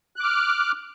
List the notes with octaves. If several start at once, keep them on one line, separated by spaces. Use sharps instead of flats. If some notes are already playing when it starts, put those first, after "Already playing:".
D6 F6 F#6